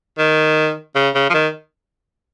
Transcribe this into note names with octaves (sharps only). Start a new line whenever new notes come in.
D#3
C#3
C#3
F3
D#3